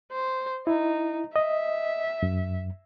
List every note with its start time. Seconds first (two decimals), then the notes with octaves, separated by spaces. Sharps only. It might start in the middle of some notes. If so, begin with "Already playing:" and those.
0.12 C5
0.67 D#4 E4
1.36 D#5 E5
2.23 F#2